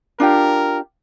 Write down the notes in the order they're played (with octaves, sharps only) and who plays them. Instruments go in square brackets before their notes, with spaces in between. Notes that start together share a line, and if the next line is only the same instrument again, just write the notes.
[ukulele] D4 F4 G4 [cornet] A#4